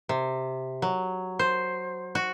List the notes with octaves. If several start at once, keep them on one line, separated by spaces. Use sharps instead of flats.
C3
F#3
C5
F#4